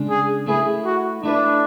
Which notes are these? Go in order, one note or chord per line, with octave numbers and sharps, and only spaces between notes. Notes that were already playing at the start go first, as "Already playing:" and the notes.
Already playing: C#3 G#3 D4
G#4
A3 E4 G#4 B4
F#4
A3 D4 E4 B4